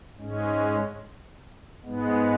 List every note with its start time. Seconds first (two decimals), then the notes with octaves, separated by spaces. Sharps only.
0.18 G#2 G#3 C#4
1.84 G#2 G#3 B3